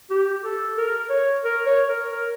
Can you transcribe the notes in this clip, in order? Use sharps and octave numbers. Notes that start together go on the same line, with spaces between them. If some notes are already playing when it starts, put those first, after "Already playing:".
G4
A4
A#4
C#5
A#4
C#5
A#4
A#4